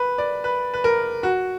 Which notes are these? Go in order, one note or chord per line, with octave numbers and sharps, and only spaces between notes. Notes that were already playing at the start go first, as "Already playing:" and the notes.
Already playing: B4
D5
B4
B4
A#4
F#4